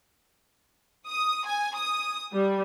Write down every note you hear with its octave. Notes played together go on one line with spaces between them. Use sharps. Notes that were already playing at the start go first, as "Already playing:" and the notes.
D#6
G#5
D#6
G3